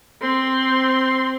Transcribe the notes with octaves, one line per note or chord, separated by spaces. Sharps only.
C4 C6